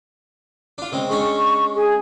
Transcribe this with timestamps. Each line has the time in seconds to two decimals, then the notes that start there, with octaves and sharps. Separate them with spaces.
0.78 D4 F4
0.92 C#3 G#3 C4
1.10 G#3 C#4 D4 C#6
1.75 G#4